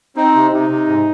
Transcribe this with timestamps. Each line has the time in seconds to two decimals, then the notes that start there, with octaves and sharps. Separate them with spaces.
0.17 C4 D#4
0.35 C3
0.52 C3 D#4
0.70 C3
0.88 G#2